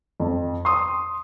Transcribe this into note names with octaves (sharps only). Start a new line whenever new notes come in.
F2
C6 D#6